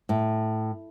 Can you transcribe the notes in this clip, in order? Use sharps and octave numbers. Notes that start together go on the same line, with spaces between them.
A2